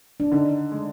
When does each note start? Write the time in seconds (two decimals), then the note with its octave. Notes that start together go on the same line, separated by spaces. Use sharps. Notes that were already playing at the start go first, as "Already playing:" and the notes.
0.20 D4
0.31 D3 D#4
0.72 G#3